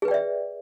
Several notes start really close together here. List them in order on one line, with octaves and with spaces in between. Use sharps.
G#4 B4 G5 D5 E5